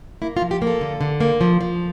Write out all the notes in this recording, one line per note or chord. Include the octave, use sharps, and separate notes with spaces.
A#3 E4
F4
F3
G4
A#3
A4
D3
D3
A#3
F3
F3